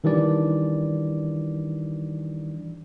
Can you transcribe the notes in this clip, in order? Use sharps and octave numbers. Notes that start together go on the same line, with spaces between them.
D#3 E3 G3 D4 D5